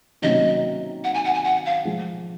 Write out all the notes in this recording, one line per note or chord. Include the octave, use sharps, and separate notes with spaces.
C3 D#3 F#3 A#3 C#4 D#5
F#5
G#5
F#5
G#5
F#5
F5
F3 G#3